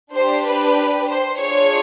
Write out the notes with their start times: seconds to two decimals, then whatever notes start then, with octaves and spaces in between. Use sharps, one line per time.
0.13 D4 G4 C5
0.45 B4
1.08 C5
1.39 D4 F4 G#4 C#5